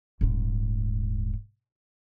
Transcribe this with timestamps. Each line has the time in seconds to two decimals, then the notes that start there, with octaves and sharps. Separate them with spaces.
0.21 D#1 G#2